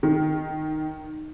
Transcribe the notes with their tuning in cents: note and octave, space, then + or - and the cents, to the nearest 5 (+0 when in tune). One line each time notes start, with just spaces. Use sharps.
D#3 -5